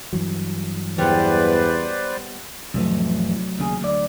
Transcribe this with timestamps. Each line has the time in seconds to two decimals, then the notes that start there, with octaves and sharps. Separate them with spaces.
0.13 G2 E3 F#3
0.98 E2 G3 B3 B4 C5 D5
2.74 F2 A2 C3 E3 F#3 A3
3.59 D#2 C#3 G#4
3.81 D2 D5